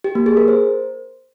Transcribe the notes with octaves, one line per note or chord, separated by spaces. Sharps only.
G4
A#3
G#4
A#4
C5